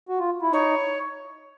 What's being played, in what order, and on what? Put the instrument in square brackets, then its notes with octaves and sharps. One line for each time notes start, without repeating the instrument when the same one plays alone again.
[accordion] F#4
F4
E4
[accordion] D#4 [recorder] C#5